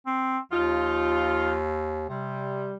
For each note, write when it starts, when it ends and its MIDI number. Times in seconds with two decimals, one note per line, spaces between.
0.06 0.39 60
0.52 2.07 39
0.52 1.56 53
0.52 1.56 63
0.52 1.56 65
2.09 2.71 48
2.09 2.75 55